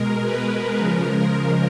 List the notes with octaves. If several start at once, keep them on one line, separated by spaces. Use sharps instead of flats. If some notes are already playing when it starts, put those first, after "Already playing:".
Already playing: B2 G#3 A#4
B4
C#3 F3 G#3 A#4
A#4